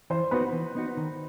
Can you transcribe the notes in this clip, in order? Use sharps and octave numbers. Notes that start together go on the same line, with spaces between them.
E3 C5
B3 D#4 F#4 B4
E3
B3 D#4 F#4
D#3